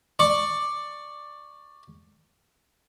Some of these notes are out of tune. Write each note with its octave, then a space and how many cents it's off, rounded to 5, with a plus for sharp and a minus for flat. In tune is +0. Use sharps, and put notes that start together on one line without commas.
D5 +10 C#6 +0